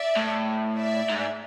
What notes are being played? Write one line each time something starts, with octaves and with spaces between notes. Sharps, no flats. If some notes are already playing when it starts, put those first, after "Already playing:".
Already playing: D5 E5
A2
D5 E5
G#2